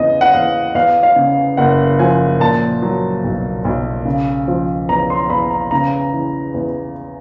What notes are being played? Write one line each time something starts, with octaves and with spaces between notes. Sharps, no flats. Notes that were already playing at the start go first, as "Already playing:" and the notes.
Already playing: E2 C#3 E3 D#5
F#5
E2 F5
E2 F5
F5
C#3
F#1 F#5
F3 G#5
A#2 A5
F#3
B1
B1
C#3
F3
E2 A#5
C6
E2 B5
A#5
C#3 A#5
E3
E2